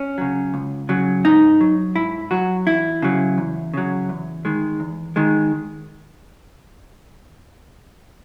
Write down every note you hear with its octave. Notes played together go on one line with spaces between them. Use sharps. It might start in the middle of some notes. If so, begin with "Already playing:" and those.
Already playing: C#4
C#3 F#3
C#2
C#3 F#3
G#2 D#4
F#3
G#2 E4
F#3 F#4
E2 E4
C#3 F#3
E2
C#3 F#3
E2
D#3 G#3
E2
D#3 G#3